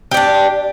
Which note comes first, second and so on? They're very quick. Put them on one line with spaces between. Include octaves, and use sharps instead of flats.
G4 D5 D4